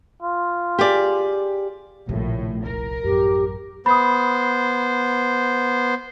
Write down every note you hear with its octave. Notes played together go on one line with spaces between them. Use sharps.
F4
G4 G#4 D5
A#1 A2 C3 D#3
F1 C2 A#4
A1 F#2 G4
B3 C5 B5 D#6